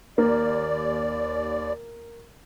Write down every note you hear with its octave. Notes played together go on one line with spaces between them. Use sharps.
D#2 A#3 D5